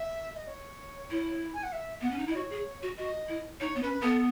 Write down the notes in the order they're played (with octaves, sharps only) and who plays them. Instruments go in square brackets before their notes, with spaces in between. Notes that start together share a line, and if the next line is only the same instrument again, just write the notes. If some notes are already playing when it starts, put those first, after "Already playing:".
Already playing: [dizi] E5
D#5
C#5
[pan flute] E4
[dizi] G#5
F#5
E5
[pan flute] B3 [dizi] F#5
[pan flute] C#4
D#4
E4
[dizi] D#5
[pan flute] F#4 [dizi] C#5
[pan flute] G#4
F#4
[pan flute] F#4 [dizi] D#5
[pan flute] E4
[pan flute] D#4 [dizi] C#5
[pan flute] B3
[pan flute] C#4 [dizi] B4
[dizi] B4
[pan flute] B3 [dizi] A4